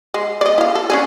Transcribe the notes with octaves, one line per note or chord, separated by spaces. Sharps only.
G#3
D5 D#5
E4 F5
A4
C#4 D4 G#4